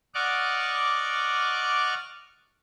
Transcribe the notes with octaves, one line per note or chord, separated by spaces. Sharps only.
D5 D#5 F#5 C#6 D6 F6